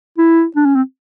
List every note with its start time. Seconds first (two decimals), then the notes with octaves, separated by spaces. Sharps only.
0.18 E4
0.56 D4
0.65 C#4
0.75 C4